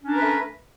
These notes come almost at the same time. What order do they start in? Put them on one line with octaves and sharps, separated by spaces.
C#4 D4 A#4 B4 A3